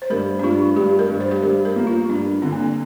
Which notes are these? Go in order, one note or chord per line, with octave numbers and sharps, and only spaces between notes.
C5
G2 A#4
D4
G2 F4
G2 G4
A#4
G2
C5
G4
G2 A#4
A#4
A#3
F4
G2 D4
D3 C4
A#3
C4